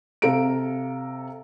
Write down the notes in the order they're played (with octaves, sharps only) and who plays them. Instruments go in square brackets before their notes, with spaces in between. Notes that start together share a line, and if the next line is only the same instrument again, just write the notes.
[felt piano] C3 G4 A4 F5 A#5 D7